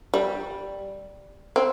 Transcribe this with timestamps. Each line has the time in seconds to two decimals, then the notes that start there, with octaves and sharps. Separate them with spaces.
0.14 G3
1.56 C4